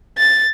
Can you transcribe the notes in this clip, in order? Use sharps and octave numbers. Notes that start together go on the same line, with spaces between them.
A6